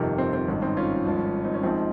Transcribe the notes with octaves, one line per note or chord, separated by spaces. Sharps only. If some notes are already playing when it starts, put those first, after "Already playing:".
Already playing: G1 F2 C3 D#3 G4 A#4
C4
C4
G#1 G2 D#3 C#4
C4 D#4
C#4 F4
G#1 G2 F3
C4 D#4
C#4
A#1 G#2 F3 C4 D#4